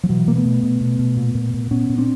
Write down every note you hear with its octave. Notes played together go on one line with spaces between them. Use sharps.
F3
B2 E3 F#3
B2 A#3
A3 B3
B2
B2
B2
B2
A#2
A#2
A#2
A#2 B3 C#4
A#2
C4 D4